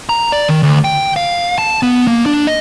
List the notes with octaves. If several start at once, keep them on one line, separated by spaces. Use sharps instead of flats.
A#5
D5
D#3
D2
G5
F5
A5
B3
A#3
D4
D#5